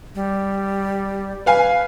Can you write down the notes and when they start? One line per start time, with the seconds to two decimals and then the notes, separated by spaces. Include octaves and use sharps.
0.15 G3
1.46 B4 F5 G#5